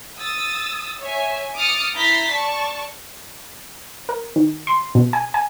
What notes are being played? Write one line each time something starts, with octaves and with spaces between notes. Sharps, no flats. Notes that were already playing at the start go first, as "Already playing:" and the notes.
D#6 E6 A6
C#5 E5 G#5
D6 D#6 F6 A6 C#7
E4 A#5 G6 A6 B6 C7
D5 A5 C#6
A#4
D#3
C6
B2
G#5
G#5